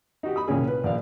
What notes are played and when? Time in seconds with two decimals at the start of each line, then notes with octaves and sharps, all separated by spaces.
0.23 D#4 F#4 G4
0.36 B5 D#6
0.48 C2 A#2 C#4 G#4
0.68 B4
0.84 A#1 D5 F5